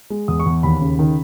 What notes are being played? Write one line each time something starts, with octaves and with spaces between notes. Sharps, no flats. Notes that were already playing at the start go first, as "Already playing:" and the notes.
G#3
E2 D#6
C#6
E2
D#2 B5
C#3
D#3